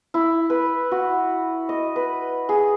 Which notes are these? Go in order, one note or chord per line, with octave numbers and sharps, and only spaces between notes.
E4
B4
F#4
D#5
B4
G#4